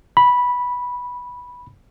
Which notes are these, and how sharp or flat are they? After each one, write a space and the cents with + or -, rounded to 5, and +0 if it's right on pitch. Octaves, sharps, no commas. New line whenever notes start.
B5 -10